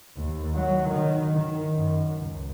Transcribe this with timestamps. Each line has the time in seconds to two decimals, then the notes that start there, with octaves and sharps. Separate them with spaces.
0.17 D#2
0.55 F#3
0.89 D#3
1.34 D#3
1.73 F#2
2.19 C#2